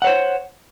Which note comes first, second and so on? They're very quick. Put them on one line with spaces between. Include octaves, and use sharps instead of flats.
F#5 C#5 C5